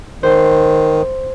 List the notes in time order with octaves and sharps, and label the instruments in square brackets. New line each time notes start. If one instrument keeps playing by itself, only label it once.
[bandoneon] D#3 [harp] C5